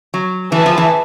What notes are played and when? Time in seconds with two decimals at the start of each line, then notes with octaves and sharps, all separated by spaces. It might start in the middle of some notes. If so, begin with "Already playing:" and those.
0.14 F#3
0.52 E3 G#4 B4 E5 A5
0.66 F3
0.78 E3